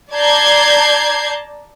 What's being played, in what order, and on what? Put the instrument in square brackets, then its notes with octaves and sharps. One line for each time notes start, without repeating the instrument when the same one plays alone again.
[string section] D5 A5 A#5 G6 G#6 C7